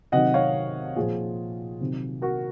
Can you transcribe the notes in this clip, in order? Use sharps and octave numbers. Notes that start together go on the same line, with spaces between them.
C3 D#3 F#3 D#5 F#5
C#5 F5
A#2 F3 F4 G#4
C3 D#3 F#3
F#4 A#4